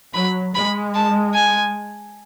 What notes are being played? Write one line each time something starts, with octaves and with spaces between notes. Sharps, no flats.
F#3 B5
G#3 B5
A5
G#5